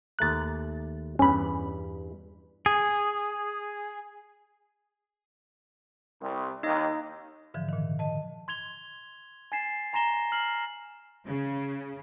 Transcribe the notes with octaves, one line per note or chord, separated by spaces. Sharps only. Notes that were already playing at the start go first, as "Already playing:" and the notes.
D#2 A3 A#5 F#6 A6
E2 G2 C#4 B5
G#4
C2
D#2 D#4 D#5
G#2 D3 E3 F3
A#2 D#3
D#5 A5
C6 G#6 F7 G7
G#5 G#6 A6 B6 C7 E7
G#5 A#5 C6 A#6 E7 G7
F6 C7 F#7
C#3